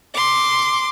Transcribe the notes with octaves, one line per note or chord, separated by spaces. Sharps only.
C6 D6